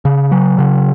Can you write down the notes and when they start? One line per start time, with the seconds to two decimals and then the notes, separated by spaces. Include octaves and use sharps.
0.05 C#3
0.32 F#3
0.59 C#3